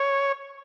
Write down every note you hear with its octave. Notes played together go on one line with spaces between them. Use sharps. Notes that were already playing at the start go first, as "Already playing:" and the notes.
Already playing: C#5